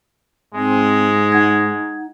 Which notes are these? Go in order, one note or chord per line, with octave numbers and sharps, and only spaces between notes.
G#2 G#3 C4
D#4 F#5 G#6